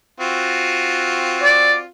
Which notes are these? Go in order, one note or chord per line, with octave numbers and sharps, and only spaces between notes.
C4 F4 F#4
D5